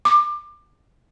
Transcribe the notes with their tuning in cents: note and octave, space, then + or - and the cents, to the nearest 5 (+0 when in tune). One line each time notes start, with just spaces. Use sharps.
D6 +25